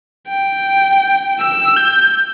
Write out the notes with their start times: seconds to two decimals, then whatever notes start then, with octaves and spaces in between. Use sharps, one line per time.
0.28 G5
1.40 E6
1.77 G6